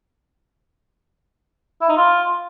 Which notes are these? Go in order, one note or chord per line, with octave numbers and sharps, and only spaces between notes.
E4
D#4
F4